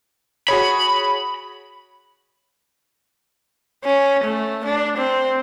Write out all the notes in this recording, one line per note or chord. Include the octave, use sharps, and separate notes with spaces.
F#4 G#4 C#5 B5
C#4
A3
D4
C4